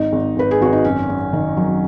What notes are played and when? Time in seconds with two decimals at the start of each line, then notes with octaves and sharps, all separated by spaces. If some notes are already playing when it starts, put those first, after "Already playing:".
Already playing: G#1 D#4
0.12 G#1
0.36 G#1 B4
0.51 G#4
0.61 G#1 F#4
0.73 D#4
0.84 F#2 C#4
1.09 F#2
1.33 D#3
1.57 F#3